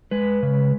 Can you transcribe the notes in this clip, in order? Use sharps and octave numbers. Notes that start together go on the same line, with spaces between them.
G#3 B4
C#3